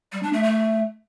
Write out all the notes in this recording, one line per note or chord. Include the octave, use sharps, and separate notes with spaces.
G3
D4
A3
A3